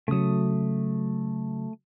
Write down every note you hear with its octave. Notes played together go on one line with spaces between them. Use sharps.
C#3 F#3 A3 D#6